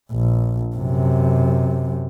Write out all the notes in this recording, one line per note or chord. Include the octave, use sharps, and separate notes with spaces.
A#1
F#2 C3